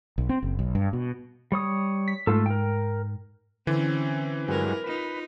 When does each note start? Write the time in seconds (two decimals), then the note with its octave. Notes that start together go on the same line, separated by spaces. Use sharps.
0.18 B1
0.29 C4
0.43 F#1
0.59 B1
0.75 G2
0.93 B2
1.52 G3 C#5 D#6
2.08 B6
2.27 G#2 A3 F4 A4
2.46 A#4 G5
3.67 D3 E3 C4 C#4
4.48 G2 F#3 G#3 A#4 B4
4.84 D#4 F4 B4